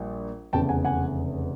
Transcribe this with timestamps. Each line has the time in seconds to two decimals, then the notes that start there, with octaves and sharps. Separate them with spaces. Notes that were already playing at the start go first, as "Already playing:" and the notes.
Already playing: A#1 A#2 G3
0.53 F1 E2 C#3 G5 A5
0.69 F#5 G#5
0.85 F#5 G#5